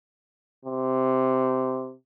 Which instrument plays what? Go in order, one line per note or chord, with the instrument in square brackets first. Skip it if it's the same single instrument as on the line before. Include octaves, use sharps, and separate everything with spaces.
[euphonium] C3